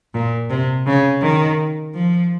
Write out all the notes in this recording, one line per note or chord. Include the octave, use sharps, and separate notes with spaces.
A#2
C3
C#3
D#3
F3